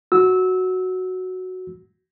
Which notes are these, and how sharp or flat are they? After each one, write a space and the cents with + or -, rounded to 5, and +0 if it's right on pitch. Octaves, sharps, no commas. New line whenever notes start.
F#4 +0 E6 -20